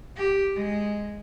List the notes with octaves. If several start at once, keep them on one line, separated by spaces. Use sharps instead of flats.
G4
G#3